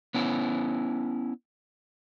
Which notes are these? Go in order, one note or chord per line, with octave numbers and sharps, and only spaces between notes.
B3 C#4 E4